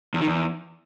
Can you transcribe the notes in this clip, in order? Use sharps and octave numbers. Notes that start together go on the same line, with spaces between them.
E2
D#3
E2